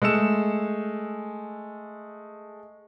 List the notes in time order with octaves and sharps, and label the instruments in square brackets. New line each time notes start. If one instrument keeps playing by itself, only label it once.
[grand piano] G#3 A3 E6 C#7 E7